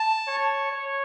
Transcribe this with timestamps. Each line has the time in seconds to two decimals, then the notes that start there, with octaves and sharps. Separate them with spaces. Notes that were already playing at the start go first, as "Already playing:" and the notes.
Already playing: A5
0.28 C#5
0.72 C#5